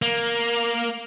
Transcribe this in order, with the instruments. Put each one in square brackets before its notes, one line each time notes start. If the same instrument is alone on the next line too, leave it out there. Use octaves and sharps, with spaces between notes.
[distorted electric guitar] A#3